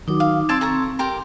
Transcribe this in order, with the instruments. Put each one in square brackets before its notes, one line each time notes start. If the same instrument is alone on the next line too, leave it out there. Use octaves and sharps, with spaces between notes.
[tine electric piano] D#3 F#3 F#4 [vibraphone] D#4 D6
[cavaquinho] F5
[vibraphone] C4 [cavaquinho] C5 D5 A5 [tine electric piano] C6 E6 G#6
[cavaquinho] A4 A#5 C#6
[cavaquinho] G4 A#4 [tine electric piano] A#5 [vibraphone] C6